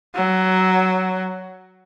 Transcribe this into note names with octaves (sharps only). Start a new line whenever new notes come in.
F#3